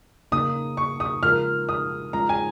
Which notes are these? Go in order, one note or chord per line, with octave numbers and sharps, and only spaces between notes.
C#3 A#3 D#4 D#6
C#6
D#6
C#3 G#3 F4 A#4 F6
D#6
G#3 C#4 F4 A#5
G#5